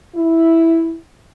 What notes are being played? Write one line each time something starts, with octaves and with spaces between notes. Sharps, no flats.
E4